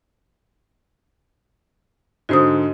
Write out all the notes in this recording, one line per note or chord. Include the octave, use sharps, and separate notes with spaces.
G#2 D3 F#4 C5 D#6